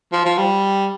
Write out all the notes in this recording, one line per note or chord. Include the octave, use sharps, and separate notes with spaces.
F3
F3
G3